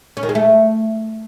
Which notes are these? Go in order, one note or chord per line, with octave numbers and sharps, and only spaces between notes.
C#4
D#3
G#3
A3